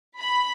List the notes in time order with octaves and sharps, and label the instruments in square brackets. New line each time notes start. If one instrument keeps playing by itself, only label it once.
[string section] B5